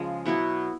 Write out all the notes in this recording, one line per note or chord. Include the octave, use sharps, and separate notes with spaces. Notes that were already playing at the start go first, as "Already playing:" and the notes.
Already playing: C#3 F3 G#3
B2 F#3 B3 E4